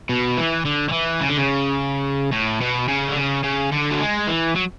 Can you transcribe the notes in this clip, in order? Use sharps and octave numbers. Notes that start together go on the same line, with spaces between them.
B2
E3
D3
D3
E3
C#3
D3
C#3
A2
B2
C#3
D3
C#3
C#3
D3
F#3
G#3
E3
F#3